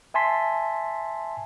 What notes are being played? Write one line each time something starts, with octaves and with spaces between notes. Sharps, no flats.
E5 G#5 A5 C6 B6